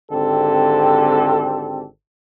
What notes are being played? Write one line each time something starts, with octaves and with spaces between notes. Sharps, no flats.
G#1 D3 C4 G4 A4